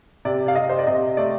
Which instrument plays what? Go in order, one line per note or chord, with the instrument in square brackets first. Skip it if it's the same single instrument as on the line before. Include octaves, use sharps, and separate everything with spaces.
[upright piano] C3 D5
F5
C3 D#5
C5
D5
C3 D#5
A3 D5